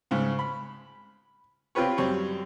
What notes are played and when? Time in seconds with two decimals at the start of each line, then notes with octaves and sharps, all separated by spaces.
0.11 G#2 C#3
0.39 B5
1.75 C4 F4 G4 B4 C#5
1.98 F#2 G3 C4 C#5